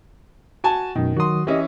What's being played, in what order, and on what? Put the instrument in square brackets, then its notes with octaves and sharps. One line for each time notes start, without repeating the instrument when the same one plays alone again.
[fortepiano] F#4 G#5 A5
[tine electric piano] F#2 B2 [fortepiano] D#3
[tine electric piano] D#3 F#3 D#6 [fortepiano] F#4 C6
[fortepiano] E3 C#4 [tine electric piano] G4 D#5